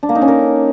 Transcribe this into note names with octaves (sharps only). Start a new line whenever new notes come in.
D4
A#3
D#4
C#4
A#4